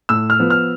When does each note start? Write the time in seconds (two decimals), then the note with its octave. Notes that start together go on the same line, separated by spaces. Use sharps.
0.09 A2 E6
0.30 F6
0.40 F3 B3
0.50 F6